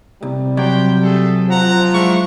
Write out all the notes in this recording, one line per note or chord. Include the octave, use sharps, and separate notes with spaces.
C2 C3 G3
F#3 G4 C5 D5 G5
A3 G#4 A4
F3 F#5 A#5
G#3 D4 E4 C#6